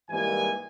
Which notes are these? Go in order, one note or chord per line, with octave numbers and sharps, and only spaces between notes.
G#2 E3 G3 A#3 G#5